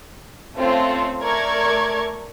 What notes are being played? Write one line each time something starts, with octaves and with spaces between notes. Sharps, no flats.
A3 C4 C#4 F4 A4
A3 A#4 D5 C#6 G#6